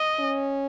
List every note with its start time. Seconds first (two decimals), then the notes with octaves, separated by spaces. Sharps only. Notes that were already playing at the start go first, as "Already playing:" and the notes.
Already playing: D#5
0.19 C#4